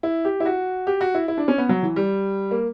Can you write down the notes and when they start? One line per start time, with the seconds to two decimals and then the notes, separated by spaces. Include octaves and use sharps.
0.03 E4
0.25 G4
0.40 E4
0.45 F#4
0.87 G4
1.01 F#4
1.14 E4
1.28 E4
1.38 D4
1.48 C#4
1.58 B3
1.69 F#3
1.82 E3
1.96 G3
2.51 A#3